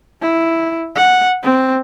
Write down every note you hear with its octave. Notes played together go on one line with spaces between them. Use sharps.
E4
F#5
C4